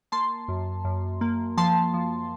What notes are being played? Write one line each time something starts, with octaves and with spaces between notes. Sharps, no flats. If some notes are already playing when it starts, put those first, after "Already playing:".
A#3 A5 C6
F#2
F#2
A#3
F3 A5 C6
F3